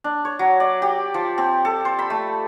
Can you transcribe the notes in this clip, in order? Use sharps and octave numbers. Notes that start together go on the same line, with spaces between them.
D4
C#5
F#3
D5
G4
F3
C4
A4
C5
B5
A3